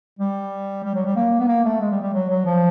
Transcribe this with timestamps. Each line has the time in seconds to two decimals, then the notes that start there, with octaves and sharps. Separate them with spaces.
0.19 G3
0.84 G3
0.95 F#3
1.05 G3
1.16 A#3
1.40 B3
1.48 A#3
1.65 A3
1.81 G#3
1.91 G3
2.02 G3
2.14 F#3
2.29 F#3
2.45 F3